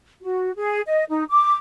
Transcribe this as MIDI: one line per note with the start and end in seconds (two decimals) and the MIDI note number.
0.23 0.51 66
0.56 0.80 68
0.87 1.04 75
1.09 1.24 63
1.30 1.55 86